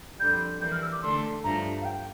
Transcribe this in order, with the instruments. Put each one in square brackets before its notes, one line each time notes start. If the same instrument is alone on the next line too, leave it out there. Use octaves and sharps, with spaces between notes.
[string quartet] F2 D3 G3 [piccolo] G6
[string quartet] E3 G3 A#3 [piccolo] G6
[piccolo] F6
E6
D6
[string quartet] D3 A3 D4 A4 [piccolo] C6
[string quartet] G2 F3 A3 D4 [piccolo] A#5
[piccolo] F5
G5